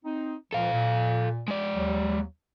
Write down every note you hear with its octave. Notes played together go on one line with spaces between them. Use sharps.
C4 D#4
C#2 A#2 F3 A4 F5
A#2
G#3 D5
D#2 F#3